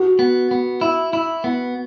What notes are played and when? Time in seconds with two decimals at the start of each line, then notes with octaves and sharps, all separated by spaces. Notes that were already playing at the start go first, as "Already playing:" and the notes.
Already playing: F#4
0.19 B3
0.51 B3
0.81 E4
1.13 E4
1.44 B3